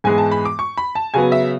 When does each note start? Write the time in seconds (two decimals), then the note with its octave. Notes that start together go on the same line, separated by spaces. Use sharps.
0.04 G#2 E3 G#3 B3 G#5
0.18 A5
0.32 B5
0.45 D6
0.59 C#6
0.77 B5
0.95 A5
1.14 C#3 F#3 B3 G#5
1.32 E5